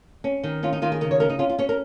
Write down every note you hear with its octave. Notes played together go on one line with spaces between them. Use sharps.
C#4
D#3
C#4 F4
D#4
D#3 F4
G#4
C#3 A#4
C#5
C#4 A#4
D#4
C#4 F4
F4
C#4 C#5
A#4